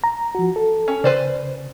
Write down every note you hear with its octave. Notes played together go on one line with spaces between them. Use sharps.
A#5
F3 F#4
A4
C#4
C#3 B4 C5 D5